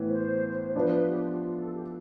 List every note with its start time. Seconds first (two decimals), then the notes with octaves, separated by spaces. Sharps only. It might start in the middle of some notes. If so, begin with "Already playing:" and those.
Already playing: A2 E3 B3
0.09 C5
0.67 C5
0.75 F3 B3 D4 B4
0.86 C5
0.92 B4
1.08 G4
1.25 F4
1.42 F4
1.58 A4
1.75 G4